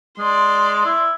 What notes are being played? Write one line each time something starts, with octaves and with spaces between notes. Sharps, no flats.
G#3 D5 C6
E4